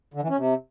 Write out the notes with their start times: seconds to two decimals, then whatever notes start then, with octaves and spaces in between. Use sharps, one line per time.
0.14 D3
0.22 E3
0.29 C#4
0.37 C3